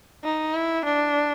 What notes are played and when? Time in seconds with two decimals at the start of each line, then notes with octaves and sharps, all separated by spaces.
0.24 D#4
0.54 E4
0.85 D4